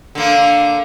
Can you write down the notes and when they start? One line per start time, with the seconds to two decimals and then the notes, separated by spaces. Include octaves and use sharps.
0.15 D3 A#3